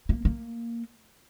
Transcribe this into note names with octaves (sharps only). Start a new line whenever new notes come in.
A#3
A#3